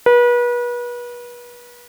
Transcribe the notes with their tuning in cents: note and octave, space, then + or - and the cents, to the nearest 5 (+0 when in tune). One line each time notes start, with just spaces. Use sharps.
B4 -35